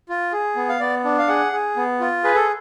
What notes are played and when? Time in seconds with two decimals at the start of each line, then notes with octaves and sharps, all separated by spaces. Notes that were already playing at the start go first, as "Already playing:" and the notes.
0.09 F4
0.32 G#4
0.56 B3
0.69 F5
0.80 B3 D5
1.04 D4
1.18 F5
1.28 G#4 F#5
1.52 G#4
1.77 B3
2.00 F4
2.24 G#4 B4
2.35 A4